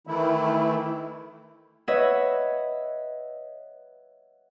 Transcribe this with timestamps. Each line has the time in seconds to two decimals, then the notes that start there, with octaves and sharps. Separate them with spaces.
0.07 D#3 E3 A3 E4
1.88 B4 C#5 D#5 E5 F#5